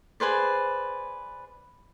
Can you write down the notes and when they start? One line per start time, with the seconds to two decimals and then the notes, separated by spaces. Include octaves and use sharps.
0.20 G#4 B4 C5 D5